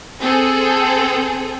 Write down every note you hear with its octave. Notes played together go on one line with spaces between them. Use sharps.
C4 G#4 A4 G5